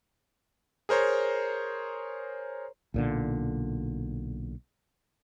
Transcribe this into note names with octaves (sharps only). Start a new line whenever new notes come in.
G#4 A#4 C5 C#5 A#5
B1 A#2 D3